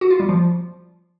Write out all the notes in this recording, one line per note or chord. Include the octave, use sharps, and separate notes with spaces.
F#4
F4
G3
F3